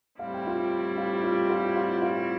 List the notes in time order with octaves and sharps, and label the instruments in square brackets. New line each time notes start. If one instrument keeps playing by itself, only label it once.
[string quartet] A2 G3 C4 E4 [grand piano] F5
[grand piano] G5
F4 F5
F4 F5
F4 F5
F4 F5
F4 F5
F4 F5